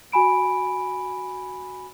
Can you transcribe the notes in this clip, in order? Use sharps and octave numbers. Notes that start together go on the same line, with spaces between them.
F#4 G#5 B5 D7